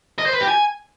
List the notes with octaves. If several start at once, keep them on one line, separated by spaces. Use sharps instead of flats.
D#5
C5
B4
G4
G#5